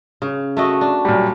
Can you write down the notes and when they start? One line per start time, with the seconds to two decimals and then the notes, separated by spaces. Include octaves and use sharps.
0.22 C#3
0.57 A3 F#4 D#5
0.81 D4
1.05 A#2 F#3 G3